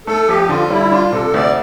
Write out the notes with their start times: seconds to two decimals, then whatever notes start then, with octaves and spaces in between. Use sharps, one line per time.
0.07 A3 A4
0.28 F2 G4
0.49 D3 F4
0.70 G3 E4
0.91 D4 F4
1.12 C3 A4
1.34 D2 D5